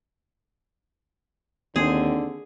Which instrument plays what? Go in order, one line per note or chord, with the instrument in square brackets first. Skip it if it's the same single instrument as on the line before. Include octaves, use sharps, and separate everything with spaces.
[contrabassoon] D#2 [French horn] D3 [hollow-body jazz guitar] C4 [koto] G#4